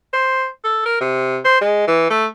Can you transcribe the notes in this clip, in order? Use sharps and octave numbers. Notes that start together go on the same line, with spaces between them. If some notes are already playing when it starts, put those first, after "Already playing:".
C5
A4
A#4
C3
C5
G#3
E3
A3